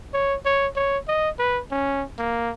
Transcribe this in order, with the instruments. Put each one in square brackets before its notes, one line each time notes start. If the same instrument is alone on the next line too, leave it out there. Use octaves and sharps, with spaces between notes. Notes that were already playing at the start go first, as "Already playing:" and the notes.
[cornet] C#5
C#5
C#5
D#5
B4
C#4
A#3